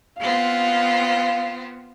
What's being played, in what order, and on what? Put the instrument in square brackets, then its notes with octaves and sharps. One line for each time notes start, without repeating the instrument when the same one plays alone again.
[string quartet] B3 C4 F4 [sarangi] F5